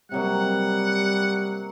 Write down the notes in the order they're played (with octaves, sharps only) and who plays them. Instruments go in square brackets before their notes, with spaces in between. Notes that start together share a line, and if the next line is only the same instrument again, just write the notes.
[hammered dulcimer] C3 F#3 A#3 [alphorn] G3 [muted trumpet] F#5